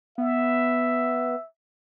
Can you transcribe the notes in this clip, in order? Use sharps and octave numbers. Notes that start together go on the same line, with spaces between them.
B3 E5